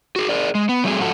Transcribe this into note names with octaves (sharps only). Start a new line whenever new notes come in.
F#4 G#4
G#4 A#4 D5
G#3
B3
F#3 G3 A3 C4 D4 G#4
G#2 F3 F#4 A4